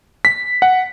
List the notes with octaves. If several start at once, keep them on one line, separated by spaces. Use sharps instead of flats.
B6
F#5